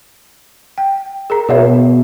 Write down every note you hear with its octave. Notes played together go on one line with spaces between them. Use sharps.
G5
G#4 A#4 A#5
B2 G#4 C#5 E5